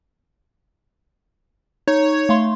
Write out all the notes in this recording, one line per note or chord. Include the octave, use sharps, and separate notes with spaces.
D#4 C#5
A3 F5 C6